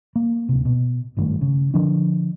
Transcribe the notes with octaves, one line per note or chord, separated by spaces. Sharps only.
A#3
D1 C3
B2
G#1 G2 D#3 A3
C#3
D3 F3 D4